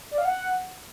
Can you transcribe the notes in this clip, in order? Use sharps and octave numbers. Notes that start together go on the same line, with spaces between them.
D5
F5
F#5